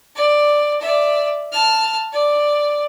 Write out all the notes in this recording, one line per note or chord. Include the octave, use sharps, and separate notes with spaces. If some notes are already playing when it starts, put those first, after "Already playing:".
D5
D5 E5
A5 F6
D5